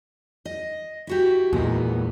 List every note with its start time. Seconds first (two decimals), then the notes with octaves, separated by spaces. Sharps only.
0.45 D#5
1.07 E4 F#4 G4
1.53 E2 A#2 G#3 B3